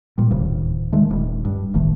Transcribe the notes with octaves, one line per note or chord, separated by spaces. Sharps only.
A#2 G3
D1 D#2 C#3
D#3 G#3 A3
D#1
G2
D#1 A1 D#3 A3